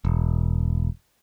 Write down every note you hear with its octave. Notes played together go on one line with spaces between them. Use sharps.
E1